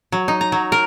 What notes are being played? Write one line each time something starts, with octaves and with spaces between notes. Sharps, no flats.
F#3
D#4
A#5
F#3
A#4